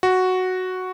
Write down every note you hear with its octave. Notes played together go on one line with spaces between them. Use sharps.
F#4